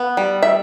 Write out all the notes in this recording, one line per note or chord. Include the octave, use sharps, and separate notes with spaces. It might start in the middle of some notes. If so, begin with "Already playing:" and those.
Already playing: B3
G3
E5